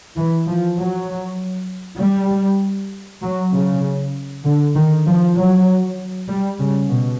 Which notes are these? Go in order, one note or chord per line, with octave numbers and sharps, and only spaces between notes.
E3
F3
F#3
G3
F#3
C#3
D3
D#3
F3
F#3
G3
C#3
B2